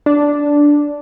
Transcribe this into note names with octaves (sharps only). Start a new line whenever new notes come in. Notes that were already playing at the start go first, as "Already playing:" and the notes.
D4